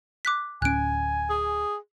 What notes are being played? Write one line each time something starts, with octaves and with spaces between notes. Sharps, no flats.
D6 F#6 B6
D1 C#4 G#5 F#6 D7
G#4